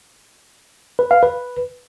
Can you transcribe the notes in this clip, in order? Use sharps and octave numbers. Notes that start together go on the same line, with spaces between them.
B4
F5
B4